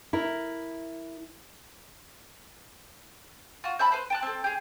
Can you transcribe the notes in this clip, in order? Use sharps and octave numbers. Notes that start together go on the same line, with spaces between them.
E4 A#4
F4 F#4
C5 E5 A5 B5
B4 C5
G5 A5 F#6
C4 A4
G4 G#4